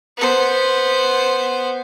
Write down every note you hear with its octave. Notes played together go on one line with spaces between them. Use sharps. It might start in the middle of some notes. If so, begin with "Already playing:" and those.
B3 C5